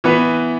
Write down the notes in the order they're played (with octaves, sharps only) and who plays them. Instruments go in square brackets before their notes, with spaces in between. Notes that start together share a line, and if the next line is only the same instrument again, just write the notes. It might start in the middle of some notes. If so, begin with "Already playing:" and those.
[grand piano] E3 B3 E4 B4